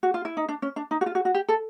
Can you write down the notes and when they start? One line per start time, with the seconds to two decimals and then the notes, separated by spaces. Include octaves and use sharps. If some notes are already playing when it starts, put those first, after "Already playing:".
0.03 F#4
0.14 F4
0.25 E4
0.37 D#4
0.49 D4
0.62 C#4
0.76 D4
0.91 D#4
1.01 F#4
1.06 F4
1.15 F#4
1.25 F#4
1.34 G4
1.48 A4